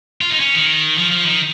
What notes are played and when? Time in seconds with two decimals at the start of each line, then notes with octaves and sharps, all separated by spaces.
0.21 F4
0.30 D#4
0.40 C#4
0.54 D#3
0.98 F3
1.12 F3
1.26 D#3